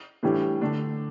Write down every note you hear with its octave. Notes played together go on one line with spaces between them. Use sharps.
A2 E3 G3 D4
D3 A3 D4